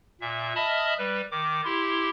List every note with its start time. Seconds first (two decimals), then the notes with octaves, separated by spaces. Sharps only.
0.21 A#2 E5
0.56 D#5 E5 A5 B5 D#6 F6
0.98 G3 B4
1.31 D#3 D6
1.65 E4 G4 C6